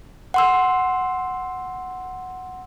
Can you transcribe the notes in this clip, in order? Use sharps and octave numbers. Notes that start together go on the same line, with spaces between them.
F#5 C6 E6